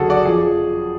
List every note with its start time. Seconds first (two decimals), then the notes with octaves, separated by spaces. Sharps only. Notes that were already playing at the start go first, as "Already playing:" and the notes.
Already playing: F#1 F#2 D3 F#3 F#4 G#4 A4
0.10 D5 F#5
0.25 F2 F3 G#4